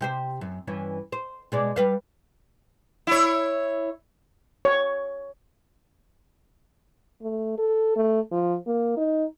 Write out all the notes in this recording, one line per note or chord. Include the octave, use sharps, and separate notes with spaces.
C3 G4 C5
F#2
G2 E3 C#4
C5
B2 G#3 D5
G3 B4 F5
E4 C#5
C#5
A3
A4
A3
F3
A#3
D#4